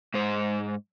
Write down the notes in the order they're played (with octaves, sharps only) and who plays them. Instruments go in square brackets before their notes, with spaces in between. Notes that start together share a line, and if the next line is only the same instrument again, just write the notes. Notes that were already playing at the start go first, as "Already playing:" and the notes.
[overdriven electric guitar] G#2 C5